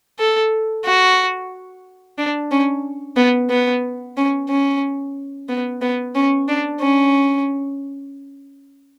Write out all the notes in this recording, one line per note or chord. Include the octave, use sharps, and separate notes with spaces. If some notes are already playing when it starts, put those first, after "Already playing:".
A4
F#4
D4
C#4
B3
B3
C#4
C#4
B3
B3
C#4
D4
C#4